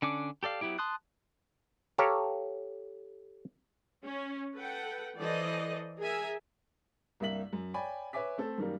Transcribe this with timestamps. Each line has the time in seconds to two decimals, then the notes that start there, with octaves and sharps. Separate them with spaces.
0.02 D3 C#4 D4 D6
0.43 G4 A4 D5 F5
0.61 F#3 B3 E4 G4
0.79 A5 C6 D#6 F#6
1.98 G4 A4 C#5 F5 A#5
4.05 C#4
4.56 A4 B4 F#5 G5
5.16 E3 A4 C5 D5 D#5
5.98 G#4 A#4 E5 G#5
7.20 C2 G2 A#3 E5 B6 F#7
7.53 F#2
7.74 C#5 D5 G5 G#5 B5
8.13 B4 C#5 E5 G#5 D6 B6
8.38 A3 C4 A4
8.58 F#2 D#3 G3 A#3